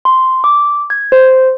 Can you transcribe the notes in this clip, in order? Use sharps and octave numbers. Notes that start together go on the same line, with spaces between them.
C6
D6
G#6
C5